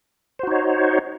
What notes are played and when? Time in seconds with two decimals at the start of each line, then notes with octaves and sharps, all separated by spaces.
0.39 C5
0.43 F#4
0.47 D#4
0.51 C#5